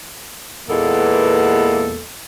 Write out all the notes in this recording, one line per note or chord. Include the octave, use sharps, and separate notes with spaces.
E2 A#2 G#3 A#3 B3 A4